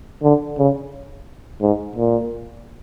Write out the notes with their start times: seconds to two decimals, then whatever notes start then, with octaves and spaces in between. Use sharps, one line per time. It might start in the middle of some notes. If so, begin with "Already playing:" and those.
0.23 D3
0.58 C#3
1.61 G#2
1.96 A#2